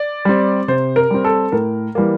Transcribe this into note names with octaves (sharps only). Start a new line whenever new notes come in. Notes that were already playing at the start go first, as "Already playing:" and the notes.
Already playing: D5
G3 C4
C3 C5
A#4
G3 C4
A4
A2 A#4
E3 G3 A#3